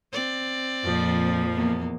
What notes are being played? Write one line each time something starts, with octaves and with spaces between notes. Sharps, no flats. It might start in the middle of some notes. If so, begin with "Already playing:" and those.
C4 D5
F2 A#2 F3
E2 A#3